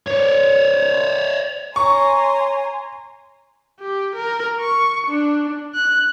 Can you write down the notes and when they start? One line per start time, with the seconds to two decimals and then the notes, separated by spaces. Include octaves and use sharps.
0.07 C#5 D5
1.76 C#5 G#5 A#5 C6 C#6
3.80 G4
4.16 A#4
4.61 C#6
5.07 D4
5.75 F#6